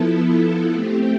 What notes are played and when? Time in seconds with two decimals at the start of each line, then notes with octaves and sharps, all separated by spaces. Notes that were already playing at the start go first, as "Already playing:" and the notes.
Already playing: F3 B3 E4 A4
0.73 A3 C4 G4